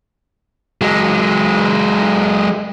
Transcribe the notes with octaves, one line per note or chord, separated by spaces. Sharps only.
F#3 G#3